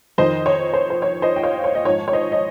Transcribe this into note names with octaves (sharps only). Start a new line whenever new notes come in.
F2 D#3 C5 D#5
C#5
C5
C5
C#5
C5 D#5
G5
C#5 F5
C#5
D#5
G#2 F3 C#5
C#5
C5 D#5
D#5